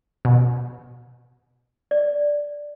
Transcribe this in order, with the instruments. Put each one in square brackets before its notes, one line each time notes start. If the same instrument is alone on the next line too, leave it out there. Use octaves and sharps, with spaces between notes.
[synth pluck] B2
[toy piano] D5